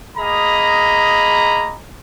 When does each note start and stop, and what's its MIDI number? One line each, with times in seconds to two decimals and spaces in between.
0.17 1.75 58
0.17 1.75 68
0.17 1.75 75
0.17 1.75 82
0.17 1.75 83